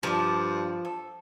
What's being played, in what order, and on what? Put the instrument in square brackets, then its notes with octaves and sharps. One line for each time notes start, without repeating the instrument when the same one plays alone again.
[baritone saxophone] G2 [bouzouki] F3 [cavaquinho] D5 A5
[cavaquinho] A4